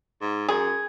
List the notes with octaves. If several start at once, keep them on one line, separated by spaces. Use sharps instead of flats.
G#2
F#2 G#4